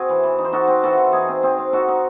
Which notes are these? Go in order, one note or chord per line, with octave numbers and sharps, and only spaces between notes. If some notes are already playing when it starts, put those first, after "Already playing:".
Already playing: C4 F#4 G#4
E3
E3
D#4
C5
D#4 F#4 A4
C4
E3 F#4 A4
E3
D#4 G#4
C4
C4 G#4
C4
D#4 F#4 A4
D#4